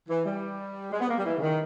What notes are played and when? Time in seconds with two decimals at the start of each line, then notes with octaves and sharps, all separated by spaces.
0.09 E3
0.25 G3
0.92 G#3
1.00 B3
1.09 A#3
1.18 G3
1.25 E3
1.38 C#3
1.42 D#3